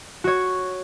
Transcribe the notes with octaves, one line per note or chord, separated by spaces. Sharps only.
F#4 C#5